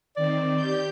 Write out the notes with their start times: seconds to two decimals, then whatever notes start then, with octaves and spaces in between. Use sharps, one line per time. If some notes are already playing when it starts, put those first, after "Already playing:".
0.17 D#3 C4 D5
0.56 G4 G6